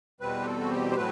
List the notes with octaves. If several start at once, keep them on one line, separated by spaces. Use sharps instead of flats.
E2 B2 G3 C4 B4
G4
A4
F#4
G4
C5
A2 F#3 A3 C4 B4